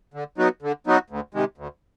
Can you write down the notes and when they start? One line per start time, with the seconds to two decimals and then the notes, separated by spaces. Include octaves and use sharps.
0.14 D3
0.38 F#3 B3 D#4 F#4
0.62 D3
0.87 F#3 B3 D#4 F#4
1.10 D2
1.34 C3 D#3 G#3
1.58 D2